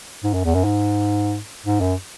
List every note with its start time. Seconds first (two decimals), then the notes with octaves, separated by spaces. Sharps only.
0.24 G#2
0.34 F#2
0.45 E2
0.55 F#2
0.64 G#2
1.66 G#2
1.81 F#2